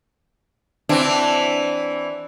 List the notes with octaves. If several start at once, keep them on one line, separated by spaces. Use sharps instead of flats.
E3 C4 D4